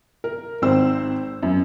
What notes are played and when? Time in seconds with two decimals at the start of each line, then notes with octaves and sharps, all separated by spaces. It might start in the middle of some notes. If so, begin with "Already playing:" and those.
0.24 A#4
0.62 G#1 C4 C5 E6
1.43 F#2